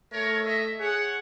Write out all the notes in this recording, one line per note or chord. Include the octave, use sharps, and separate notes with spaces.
A3 A#4 C#5
D#5 E5
G#4 C#5 F#5